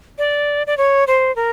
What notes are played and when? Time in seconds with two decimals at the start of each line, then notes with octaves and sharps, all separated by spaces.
0.18 D5
0.67 D5
0.78 C#5
1.07 C5
1.36 A#4